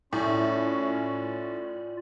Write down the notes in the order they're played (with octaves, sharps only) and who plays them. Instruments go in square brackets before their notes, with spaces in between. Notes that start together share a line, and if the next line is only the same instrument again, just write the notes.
[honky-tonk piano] A2 [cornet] C#4 [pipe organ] F4 D5